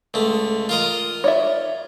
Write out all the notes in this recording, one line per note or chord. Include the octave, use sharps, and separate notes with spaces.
C#2 A3
F4 A#4 D#5
C#5 D5 E5